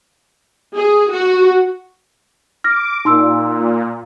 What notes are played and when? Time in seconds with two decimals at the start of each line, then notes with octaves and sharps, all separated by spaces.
0.76 G#4
1.12 F#4
2.64 D6 F6 A#6
3.05 A#2 D#4 C6 E6